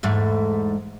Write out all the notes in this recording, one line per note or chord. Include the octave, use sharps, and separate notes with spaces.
E2 G#2 A3